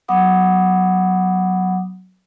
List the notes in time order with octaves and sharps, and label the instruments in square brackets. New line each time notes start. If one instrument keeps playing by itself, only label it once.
[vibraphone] F#3 B3 F#5 B5 D6 D#6